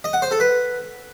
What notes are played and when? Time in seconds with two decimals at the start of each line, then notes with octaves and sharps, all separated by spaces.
0.04 D#5
0.13 F#5
0.22 C5
0.31 A4
0.40 B4